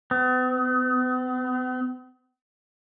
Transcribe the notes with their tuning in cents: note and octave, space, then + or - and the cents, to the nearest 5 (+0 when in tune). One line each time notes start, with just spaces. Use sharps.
B3 +45